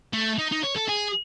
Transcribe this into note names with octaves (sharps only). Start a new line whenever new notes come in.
A3
D#4
D#4
C#5
A4
G#4